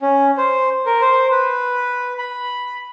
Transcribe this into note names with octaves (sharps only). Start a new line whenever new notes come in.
C#4
C5
A#4
C5
B4
B5